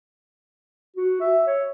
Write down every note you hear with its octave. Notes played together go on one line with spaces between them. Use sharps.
F#4
E5
C#5